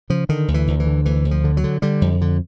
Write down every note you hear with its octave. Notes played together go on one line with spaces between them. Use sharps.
C#3 F3
D3 D#3
D2
E3
D2
E3
D3
D2 E3
D2
F3
D3
F#3
D3
D3 G3
F2
D3